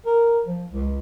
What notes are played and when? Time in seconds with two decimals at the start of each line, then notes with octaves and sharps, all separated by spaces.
0.06 A#4
0.46 F3
0.73 C#2